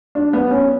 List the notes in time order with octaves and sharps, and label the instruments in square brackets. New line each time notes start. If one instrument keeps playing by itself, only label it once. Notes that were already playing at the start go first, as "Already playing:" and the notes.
[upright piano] D4
B3
C#4